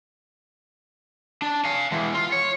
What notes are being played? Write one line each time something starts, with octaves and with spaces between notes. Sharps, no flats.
D4
F5 G#5
E3 G#3
F4
C#5